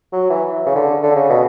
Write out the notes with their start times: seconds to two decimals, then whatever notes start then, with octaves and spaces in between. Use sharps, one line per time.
0.13 F#3
0.30 E3
0.66 C#3
0.76 D3
1.03 D3
1.16 C#3
1.29 B2